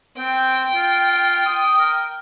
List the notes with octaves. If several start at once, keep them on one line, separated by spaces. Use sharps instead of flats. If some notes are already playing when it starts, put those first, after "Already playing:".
C4 G5
F4
D#6
A#4